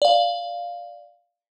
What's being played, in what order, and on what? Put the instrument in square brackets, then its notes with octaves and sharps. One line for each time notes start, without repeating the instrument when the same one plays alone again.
[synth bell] D5 F5